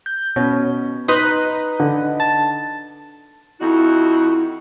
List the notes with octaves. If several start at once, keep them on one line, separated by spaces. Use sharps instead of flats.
G6
B2 C#4
D#4 B4 D#5 C6
D3
A5
F2 D#4 E4 F#4